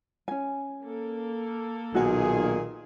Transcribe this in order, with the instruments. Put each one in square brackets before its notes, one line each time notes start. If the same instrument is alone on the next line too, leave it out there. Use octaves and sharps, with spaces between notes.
[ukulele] C#4 G#5
[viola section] A#3 A4
[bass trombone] B1 [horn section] A#2 D#3 G#4 [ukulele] F#4 F#5 G#5